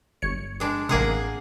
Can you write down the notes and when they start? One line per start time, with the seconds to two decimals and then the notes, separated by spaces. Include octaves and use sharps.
0.22 G1 C#5 C#7
0.60 G#3 D4
0.89 A1 C3 A#3 G#4 F#5